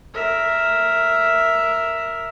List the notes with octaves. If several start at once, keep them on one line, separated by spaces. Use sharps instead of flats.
A#4 E5